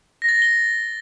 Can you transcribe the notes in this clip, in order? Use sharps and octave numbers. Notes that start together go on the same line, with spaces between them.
A#6
A6
A#6
G7